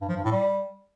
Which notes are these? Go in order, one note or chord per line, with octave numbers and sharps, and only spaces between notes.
G2
F3
G2
A2
G3